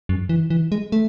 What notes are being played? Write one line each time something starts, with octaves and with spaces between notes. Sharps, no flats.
F#2
E3
E3
G#3
A3